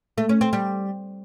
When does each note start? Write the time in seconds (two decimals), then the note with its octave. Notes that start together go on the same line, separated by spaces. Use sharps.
0.18 A3
0.29 C#4
0.41 C4
0.53 G3